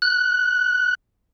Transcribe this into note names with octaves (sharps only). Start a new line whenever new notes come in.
F#6